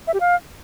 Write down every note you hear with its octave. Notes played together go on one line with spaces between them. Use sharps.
E5
G4
F5